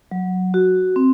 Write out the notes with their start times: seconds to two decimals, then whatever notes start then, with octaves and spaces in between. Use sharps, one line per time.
0.11 F#3
0.54 F#4
0.96 C4